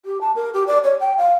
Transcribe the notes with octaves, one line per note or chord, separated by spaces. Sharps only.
G4
A5
A#4
G4
D5
C#5
G5
F5